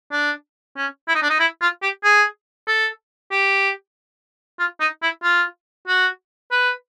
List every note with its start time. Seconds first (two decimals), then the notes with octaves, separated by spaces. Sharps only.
0.12 D4
0.77 C#4
1.08 E4
1.15 D#4
1.22 D4
1.30 D#4
1.40 E4
1.62 F4
1.82 G4
2.04 G#4
2.68 A4
3.31 G4
4.59 F4
4.81 D#4
5.03 E4
5.23 F4
5.88 F#4
6.51 B4